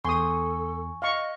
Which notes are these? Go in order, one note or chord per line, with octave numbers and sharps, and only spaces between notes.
E2 A4 G#5 C6 C#6 D#6
D#5 F5 C#6